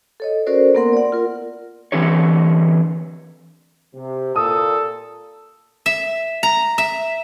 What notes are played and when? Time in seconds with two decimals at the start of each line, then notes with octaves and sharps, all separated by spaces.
0.20 A4 C#5 D#5
0.47 C#4 F#4 A4 A#4 C5 D5
0.75 A#3 B3 A#4 F#5 C6
0.93 D5 F#5
1.12 F4 A#4
1.92 D3 E3 C4 D#4 G4 C#5
3.94 C3
4.36 A#2 A4 D#6
5.86 E5
6.43 A#5
6.78 E5